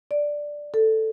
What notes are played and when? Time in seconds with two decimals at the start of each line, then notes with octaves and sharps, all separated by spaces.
0.11 D5
0.74 A4